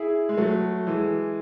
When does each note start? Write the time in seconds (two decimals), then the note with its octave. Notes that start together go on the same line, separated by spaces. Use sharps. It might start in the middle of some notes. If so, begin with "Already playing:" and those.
Already playing: E4 G#4
0.29 G#3
0.37 F#3 A3
0.87 E3 G#3